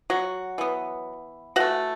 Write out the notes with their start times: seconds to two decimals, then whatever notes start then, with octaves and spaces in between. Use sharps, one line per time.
0.10 F#3 F#4
0.58 E3 B3
1.56 E3 F#4 F#5
1.60 A3